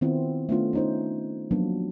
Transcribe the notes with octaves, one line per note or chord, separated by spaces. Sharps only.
D#3 B3 C4 E4 F4
A3 B3 C#4 D4 F4
C#4 D#4 C5
F3 F#3 A#3 B3 D4